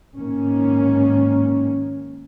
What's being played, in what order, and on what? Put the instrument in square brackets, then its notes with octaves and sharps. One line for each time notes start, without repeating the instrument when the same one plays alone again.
[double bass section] G#2 D#3 A#3 C#4